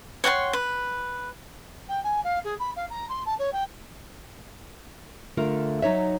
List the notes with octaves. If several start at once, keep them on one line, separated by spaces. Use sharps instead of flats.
C#5 F#5 G5 C6
B4
G5
G#5
F5
G#4
B5
F5
A#5
C6
A5
C#5
G5
D3 A3 F4 A#4
F#3 D#4 C#5 E5